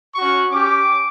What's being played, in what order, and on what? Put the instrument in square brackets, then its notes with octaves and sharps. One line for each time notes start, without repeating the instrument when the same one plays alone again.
[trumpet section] C#4 F#4 C#6
C#4 G4 D6